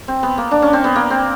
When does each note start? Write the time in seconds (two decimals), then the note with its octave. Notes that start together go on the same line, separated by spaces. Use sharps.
0.08 C4
0.23 B3
0.38 A#3
0.51 D4
0.62 C#4
0.73 C4
0.84 B3
0.96 A#3
1.10 C4